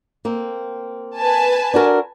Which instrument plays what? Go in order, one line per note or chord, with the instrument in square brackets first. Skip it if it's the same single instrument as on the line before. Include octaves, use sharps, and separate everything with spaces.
[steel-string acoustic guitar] A#3 C4
[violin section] B4 G#5 A5
[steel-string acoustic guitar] D4 F#4 A#4